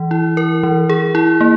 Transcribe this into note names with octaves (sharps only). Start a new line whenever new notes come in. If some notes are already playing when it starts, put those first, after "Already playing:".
Already playing: E3
E4
A#4
E3
G#4
E4
A#3